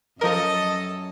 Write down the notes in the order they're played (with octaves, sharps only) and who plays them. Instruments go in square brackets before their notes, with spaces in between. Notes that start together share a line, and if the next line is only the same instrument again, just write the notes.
[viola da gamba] F#2 [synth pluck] F3 A#4 [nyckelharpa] A4 [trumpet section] D#5